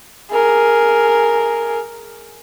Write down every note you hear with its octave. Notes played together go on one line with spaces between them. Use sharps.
G#4 A#4